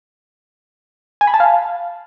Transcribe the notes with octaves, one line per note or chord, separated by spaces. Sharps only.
G#5
B5
A5
F5